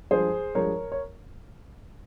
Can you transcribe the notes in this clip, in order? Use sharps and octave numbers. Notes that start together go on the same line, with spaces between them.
G2 F3 G#3 G#4 C5
G2 F3 G#3 A#4 C#5
C#5